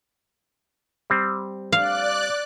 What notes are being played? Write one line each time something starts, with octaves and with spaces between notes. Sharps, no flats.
G3 C4
D5 F5 F#6